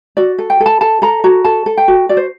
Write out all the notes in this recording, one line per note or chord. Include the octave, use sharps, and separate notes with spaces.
F#4 D5
A4
G5
A4
A5
A4 A5
A4 A#5
F#4 A#5
A4 A5
A4
G5
F#4
F#4 D5
C5